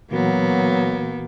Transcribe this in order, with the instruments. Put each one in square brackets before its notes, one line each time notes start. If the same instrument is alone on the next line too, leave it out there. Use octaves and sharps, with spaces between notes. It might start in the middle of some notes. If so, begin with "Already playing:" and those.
[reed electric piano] A#2 E3 F#4 [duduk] F#3 [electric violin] A#3 B3